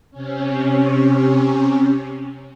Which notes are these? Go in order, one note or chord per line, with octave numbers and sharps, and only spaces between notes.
C3 C#4